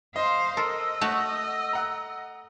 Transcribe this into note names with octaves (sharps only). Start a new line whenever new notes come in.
C5 D#5 F5
A4 A#4 D#5 E6
A3 F#4
F#5 A#5